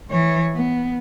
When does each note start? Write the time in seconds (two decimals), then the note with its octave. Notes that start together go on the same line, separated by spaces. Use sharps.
0.11 E3 C#5
0.55 B3